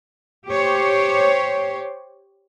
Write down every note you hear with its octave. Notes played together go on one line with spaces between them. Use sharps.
G4 C5 C#5